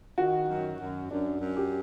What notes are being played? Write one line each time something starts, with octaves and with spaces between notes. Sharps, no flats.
D#3 F#4
F#2
F#2
F#2 D4
F#2
G4